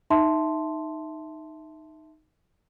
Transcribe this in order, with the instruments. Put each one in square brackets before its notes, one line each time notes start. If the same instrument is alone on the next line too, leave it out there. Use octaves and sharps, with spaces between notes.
[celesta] D#4 E5 A5 C6